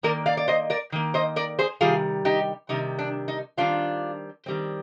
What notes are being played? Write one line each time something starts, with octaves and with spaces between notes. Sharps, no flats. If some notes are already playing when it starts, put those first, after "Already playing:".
D#3 A#3 A#4 D5
D5 F5
D5
C5 D#5
A#4 D5
D#3 A#3
C5 D#5
A#4 D5
G#4 C5
C3 D#3 G3 F4 G#4
D#4 G4
C3 D#3 G3 D#4
D4
D#4
D#3 G3 C4 D4 F4
D#3 G3 C4